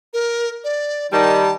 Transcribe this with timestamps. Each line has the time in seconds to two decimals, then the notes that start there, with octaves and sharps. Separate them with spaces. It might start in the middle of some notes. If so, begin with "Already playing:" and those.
0.13 A#4
0.64 D5
1.12 D#3 G3 A5